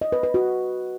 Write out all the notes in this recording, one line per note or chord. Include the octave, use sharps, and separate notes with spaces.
D#5
B4
B4
F#4